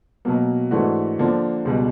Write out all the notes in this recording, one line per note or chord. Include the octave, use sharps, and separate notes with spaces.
B2 F#3 A#3
G#2 E3 A3 D4 F#4
D3 F3 A#3 D4
C#2 B2 G3